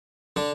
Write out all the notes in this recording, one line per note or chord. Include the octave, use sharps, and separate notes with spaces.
D3 D4